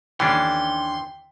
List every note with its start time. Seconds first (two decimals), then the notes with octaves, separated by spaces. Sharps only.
0.20 D#2 D3 E3 C#4 D4 G5 C6 B6